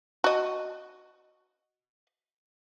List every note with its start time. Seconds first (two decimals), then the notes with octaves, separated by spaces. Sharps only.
0.24 F#4 D#5